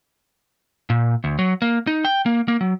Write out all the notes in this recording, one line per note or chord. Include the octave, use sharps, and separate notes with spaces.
A#2
D2
F#3
A#3
D#4
G5
A#3
A#3
F#3